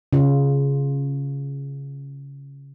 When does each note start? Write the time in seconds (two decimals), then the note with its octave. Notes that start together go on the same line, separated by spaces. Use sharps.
0.13 C#3 F4